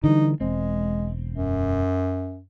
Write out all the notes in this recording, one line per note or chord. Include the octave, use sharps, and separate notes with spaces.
D3 E3 G3 D#4
E1 G#3 C4
F#2